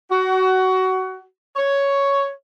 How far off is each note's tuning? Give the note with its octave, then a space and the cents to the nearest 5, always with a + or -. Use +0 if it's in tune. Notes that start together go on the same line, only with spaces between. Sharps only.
F#4 +20
C#5 +5